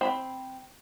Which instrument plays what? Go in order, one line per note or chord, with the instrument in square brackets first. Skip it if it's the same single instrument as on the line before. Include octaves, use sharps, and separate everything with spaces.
[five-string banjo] C4 B5